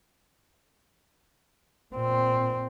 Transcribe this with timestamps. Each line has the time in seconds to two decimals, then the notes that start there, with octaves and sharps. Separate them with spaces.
1.94 A#2 C4